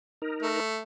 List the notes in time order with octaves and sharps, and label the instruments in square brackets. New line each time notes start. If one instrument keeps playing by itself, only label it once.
[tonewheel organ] D#4 A#4
[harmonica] A3